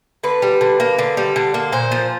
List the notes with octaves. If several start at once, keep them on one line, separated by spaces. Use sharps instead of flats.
D3 B4
G3
D3
A#3
D3
G3
D3
A#3
A#2 C5
F3